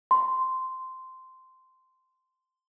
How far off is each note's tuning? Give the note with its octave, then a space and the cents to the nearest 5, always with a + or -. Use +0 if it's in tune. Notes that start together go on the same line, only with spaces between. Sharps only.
C6 -10